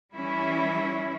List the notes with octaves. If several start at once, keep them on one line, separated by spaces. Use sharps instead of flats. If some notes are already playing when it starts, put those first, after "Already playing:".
E3 G3 C#4 E4